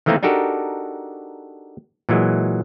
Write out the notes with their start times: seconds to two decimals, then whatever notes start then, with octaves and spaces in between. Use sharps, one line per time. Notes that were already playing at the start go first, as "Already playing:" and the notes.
0.06 D#3 E3 A3 A#3 C4 D#4
0.23 D4 D#4 F#4 G4 A4 A#4
2.09 A#2 E3 F#3 G#3